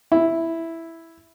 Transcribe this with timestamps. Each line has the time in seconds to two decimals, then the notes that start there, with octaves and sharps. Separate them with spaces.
0.12 E4